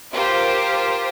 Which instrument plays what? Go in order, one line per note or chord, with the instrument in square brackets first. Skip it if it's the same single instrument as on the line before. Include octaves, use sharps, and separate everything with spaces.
[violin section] F4 G4 A#4 C5